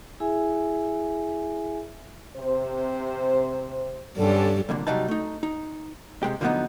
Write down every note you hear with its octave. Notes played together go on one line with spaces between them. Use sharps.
E4 G#4 E5 G#5
C3 C5
G2 D3 G3 C#4 G4 A4
C2 F2 A#2 D3
C3 F#3 G3 D#4 A5
A3 D#4
D#4
C3 G#3 G4
D3 F3 F#3 G#3 B3 D#4